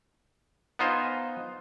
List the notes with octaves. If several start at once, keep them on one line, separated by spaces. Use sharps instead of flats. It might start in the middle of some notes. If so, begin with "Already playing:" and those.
B3 D#4 F4 C5 D#5 G#5